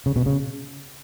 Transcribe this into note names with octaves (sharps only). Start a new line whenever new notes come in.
C#3
B2
C#3